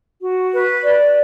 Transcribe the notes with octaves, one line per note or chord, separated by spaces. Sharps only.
F#4
B4
D5